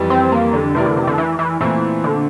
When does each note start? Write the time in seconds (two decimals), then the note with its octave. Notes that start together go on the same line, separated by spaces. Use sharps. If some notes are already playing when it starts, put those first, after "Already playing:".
Already playing: F2 E3 G3
0.10 C4
0.32 A#3
0.53 D3
0.75 C3 E3 A3 E4 A#4 D5
0.86 D3
0.96 C3
1.07 D3
1.18 E3
1.39 E3
1.60 A#2 E3 A3 C4
2.04 D3